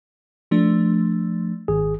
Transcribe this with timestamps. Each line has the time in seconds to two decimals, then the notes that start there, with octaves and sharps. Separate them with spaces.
0.51 F3 A3 D4
1.68 G#1 G#4